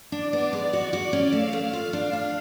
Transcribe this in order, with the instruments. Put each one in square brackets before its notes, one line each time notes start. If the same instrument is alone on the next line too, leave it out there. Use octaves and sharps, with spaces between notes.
[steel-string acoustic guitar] D4 [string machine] D5
[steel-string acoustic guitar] B3
G#3
F#4
F#4
C#4
[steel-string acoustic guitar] A3 [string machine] F5
[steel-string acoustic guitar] A3
F4
D4
D4